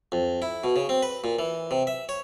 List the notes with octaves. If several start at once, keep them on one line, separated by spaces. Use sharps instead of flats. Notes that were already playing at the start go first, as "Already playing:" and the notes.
F2
E4
B2
C#3
C4
B4
A#2
E3
C3
E5
C#5